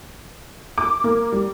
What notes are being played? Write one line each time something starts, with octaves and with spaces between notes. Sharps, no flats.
D6
A#3
G3